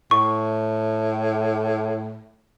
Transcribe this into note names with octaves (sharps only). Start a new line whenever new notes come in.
A2 C#6